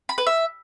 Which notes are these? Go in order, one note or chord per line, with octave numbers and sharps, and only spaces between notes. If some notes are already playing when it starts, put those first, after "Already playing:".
B5
B4
E5